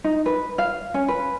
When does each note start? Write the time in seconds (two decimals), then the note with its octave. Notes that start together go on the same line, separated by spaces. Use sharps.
0.04 D#4
0.26 B4
0.58 F5
0.94 C#4
1.08 B4